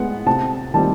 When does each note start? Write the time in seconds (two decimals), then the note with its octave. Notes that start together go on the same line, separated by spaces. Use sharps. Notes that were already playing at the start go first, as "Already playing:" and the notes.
Already playing: G#3 B3 F#5
0.26 C3 A5
0.74 D#3 G3 C4 A5